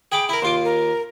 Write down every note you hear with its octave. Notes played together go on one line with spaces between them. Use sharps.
G#4 G5 B5 D6
E4 A#4 B5
D#2 F4 C6 D6
A#4